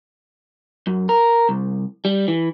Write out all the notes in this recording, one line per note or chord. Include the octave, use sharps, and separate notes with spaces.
F#2
A#4
C2
G3
E3